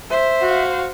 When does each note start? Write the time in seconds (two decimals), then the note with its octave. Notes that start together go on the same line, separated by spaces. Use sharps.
0.10 C5 E5
0.41 F#4 F5